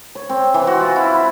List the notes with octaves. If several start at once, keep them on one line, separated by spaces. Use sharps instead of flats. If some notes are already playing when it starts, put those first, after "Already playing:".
C#5
C4
E3
F#4
F4
E4
B5